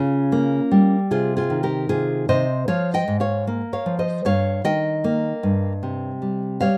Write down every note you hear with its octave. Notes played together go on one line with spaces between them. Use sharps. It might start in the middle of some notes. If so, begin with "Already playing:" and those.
Already playing: C#3 C#4 F4
A#3
G3
C3 F4 G#4
F4 G#4
D#3
G4 A#4
C3 F4 G#4
C3 C5 D#5
F3 C#5 F5
D#5 G5
G#2
C#5 F5
A#3
C#5 F5
F3
C5 D#5
G2 C#5 F5
D#3 D#5 G5
A#3
G2
C3
G3
G3 C#5 F5